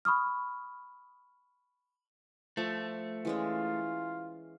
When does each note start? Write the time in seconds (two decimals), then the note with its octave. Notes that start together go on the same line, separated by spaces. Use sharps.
0.05 B5 C#6 D#6 F6
2.57 F3 A3
3.25 E3 G#3 C#4 F4